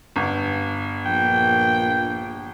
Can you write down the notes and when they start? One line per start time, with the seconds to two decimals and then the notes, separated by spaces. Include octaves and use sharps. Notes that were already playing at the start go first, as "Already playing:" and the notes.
0.16 G1
1.06 A#1 G5